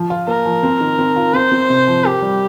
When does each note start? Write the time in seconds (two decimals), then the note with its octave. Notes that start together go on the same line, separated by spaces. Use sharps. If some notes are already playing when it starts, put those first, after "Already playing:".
Already playing: F3
0.10 F4
0.28 A#3 A#4
0.46 F3
0.63 C4
0.81 D#3
0.99 C4
1.16 F4
1.34 C4 C5
1.52 C4
1.70 C3
1.88 F3
2.05 G4 A#4
2.22 G3